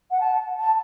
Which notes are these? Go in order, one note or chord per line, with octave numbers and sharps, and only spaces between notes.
F#5
A5
A5